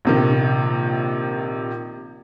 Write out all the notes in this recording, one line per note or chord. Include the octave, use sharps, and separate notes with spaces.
A#1 C3 D#3